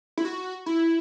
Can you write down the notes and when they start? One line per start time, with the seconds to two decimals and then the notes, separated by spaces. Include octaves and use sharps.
0.18 E4
0.25 F#4
0.66 E4